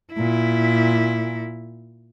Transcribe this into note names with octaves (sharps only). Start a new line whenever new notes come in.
A#2 E4